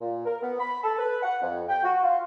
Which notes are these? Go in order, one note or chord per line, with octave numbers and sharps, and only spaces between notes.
A#2
A#4
B3
B5
A4
B4
F#5
F2
G5
F#4
F4